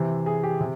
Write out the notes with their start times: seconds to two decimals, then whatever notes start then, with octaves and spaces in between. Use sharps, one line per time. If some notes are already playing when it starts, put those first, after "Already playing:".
Already playing: C3 E3 C5
0.26 G#4
0.43 G4
0.60 C3